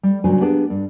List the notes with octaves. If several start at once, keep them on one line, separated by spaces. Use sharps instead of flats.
G3
G2 A#2 C#3 F#3 C5 G#5
A#3 B3 D4 G4 G#4
G2